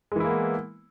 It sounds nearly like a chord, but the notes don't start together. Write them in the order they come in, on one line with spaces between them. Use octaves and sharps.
G#3 E3 E4 A#3 B3